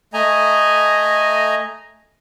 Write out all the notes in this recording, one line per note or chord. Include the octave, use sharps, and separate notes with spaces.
A3 D#5 G#5 A#5